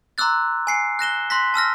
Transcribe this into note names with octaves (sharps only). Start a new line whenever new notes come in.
A#5 C6 D6 E6 F#6 A6
G#5 C7 C#7
F#6 A#6 E7 G7
C6 F#6 A#6 B6
A5 E6 F6 A#6